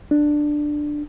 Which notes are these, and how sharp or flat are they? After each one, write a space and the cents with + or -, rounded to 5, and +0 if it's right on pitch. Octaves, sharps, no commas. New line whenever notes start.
D4 +10